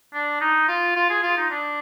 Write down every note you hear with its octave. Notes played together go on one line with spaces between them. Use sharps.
D4
D#4
F4
F4
G#4
F4
D#4
D4